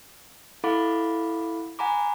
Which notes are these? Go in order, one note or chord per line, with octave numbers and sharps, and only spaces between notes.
E4 A4 F5 F#5 B5 D6
F#5 G#5 A#5 B5 D6